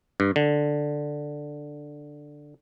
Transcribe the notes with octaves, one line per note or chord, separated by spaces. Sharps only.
G2
D3